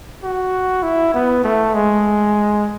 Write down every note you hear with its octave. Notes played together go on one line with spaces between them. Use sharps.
F#4
E4
B3
A3
G#3